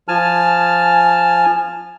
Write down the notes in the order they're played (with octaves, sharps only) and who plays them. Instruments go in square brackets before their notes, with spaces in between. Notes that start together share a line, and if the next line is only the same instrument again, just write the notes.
[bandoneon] F3 A5 F6 [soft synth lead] G#5